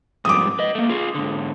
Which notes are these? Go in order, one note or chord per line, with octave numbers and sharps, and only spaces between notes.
G#2 F3 G3 D6 D#6
B4 D#5
A3 A#3
F4 G#4
G#2 D3